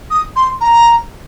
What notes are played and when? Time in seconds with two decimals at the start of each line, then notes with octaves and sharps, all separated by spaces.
0.10 D#6
0.36 C6
0.60 A#5